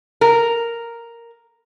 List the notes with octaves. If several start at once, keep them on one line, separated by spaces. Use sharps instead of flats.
A#4